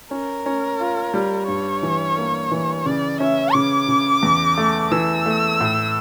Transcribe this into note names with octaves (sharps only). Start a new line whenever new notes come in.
C#4 A#4
C#4
F4
G3
G2 C#5
E3
A#3
E3
C#3 D5
C#4 E5
C#3 D6
C#3
E2
A3
E3 E6
A3
A2